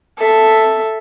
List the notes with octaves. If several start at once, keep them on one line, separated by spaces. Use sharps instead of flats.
A4 E5